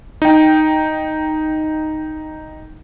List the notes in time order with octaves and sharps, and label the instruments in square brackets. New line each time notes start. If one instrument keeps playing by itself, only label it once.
[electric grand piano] D#4 G5